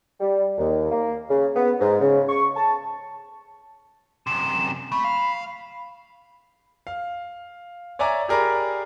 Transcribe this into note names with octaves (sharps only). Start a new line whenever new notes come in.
G3
D#2
A#3
C#3
B3
G#2
C#3
C#6
A5
F#2 C3 E7
A3 B5
F5
F5
C#5 D5 E5 G#5 A#5 D6
G4 G#4 A#4 D5 A#5 B5